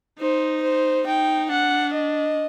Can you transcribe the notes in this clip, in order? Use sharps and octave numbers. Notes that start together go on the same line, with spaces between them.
D#4 C5
C5
D#4 G5
D4 F#5
D#5